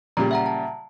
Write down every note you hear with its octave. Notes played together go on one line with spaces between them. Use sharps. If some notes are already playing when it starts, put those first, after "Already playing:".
A#2 C#3 G3 A#5
E5 F#5 A#5
A5